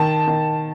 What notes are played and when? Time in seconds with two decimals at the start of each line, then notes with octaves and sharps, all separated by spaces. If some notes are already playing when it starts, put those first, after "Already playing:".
Already playing: D#3 A5
0.28 D#3